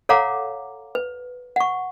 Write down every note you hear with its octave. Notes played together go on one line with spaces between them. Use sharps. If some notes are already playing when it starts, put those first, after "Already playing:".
A4 C#5 F5 F#5 A#5 D6
B4
F#5 C#6